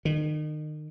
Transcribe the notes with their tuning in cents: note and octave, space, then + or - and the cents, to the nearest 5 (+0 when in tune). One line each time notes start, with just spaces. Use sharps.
D#3 -35